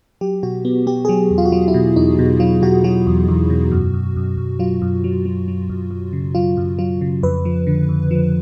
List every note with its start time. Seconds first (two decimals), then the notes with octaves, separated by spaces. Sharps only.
0.21 F#3 G4
0.43 B2 F#4
0.65 B3
0.87 B3 G4
1.05 G#4
1.08 F#3 G4
1.31 E2
1.38 F4
1.46 F#4
1.52 F#3 F4
1.68 E4
1.74 B2
1.96 E2 D#4
2.19 B2
2.40 F#3 F4
2.62 B2 F#4
2.84 F#3 F#4
3.07 E2
3.28 E2
3.50 B2
3.72 F#2
3.94 F#2
4.16 F#2
4.37 F#2
4.59 F#3 F4
4.82 F#2
5.04 F#3
5.26 F#3
5.48 F#3
5.70 F#2
5.91 F#2
6.13 C#3
6.35 F#3 F4
6.57 F#2
6.79 F#3 F4
7.01 C#3
7.23 F2 B4
7.45 F3
7.67 D3
7.89 F2
8.11 F3